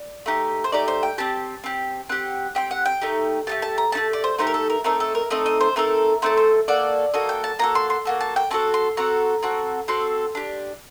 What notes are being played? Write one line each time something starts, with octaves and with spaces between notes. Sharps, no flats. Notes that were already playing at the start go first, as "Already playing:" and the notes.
Already playing: D5
A3 D#4 G4
C5
A3 D#4 G4 D5
C5
G5
C4 G4 A5
C4 G4
C4 G4 F#5
C4 G4 G5
F#5
G5
A3 D#4 G4
A3 D#4 G4 A5
A5
A#5
A3 D#4 G4 A5
D5
C5
A3 D#4 G4 C5
A#4
A4
A#4
A3 C4 D#4 A4 A#4
A4
A#4
A3 C4 D#4 A4 D#5
D#5
C5
A3 C4 D#4 A4 A#4
A3 C4 D#4 A4 C5
C5
A#3 F#4 A4 D5
A#3 F#4 A4 D#5
G5
A5
A#3 F#4 A4 A#5
C6
C6
A#3 F#4 A4
A5
G5
C4 F#4 A4 A5
C6
C4 F#4 A4 A#5
C4 F#4 A4
C4 F#4 A4 C6
D4 G4